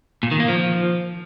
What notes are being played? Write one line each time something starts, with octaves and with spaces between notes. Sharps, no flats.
A#2
D#3
A#3
F3